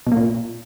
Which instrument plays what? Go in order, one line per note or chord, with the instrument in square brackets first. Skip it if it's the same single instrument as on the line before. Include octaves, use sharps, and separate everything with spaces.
[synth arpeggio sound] B2
A#3
A#2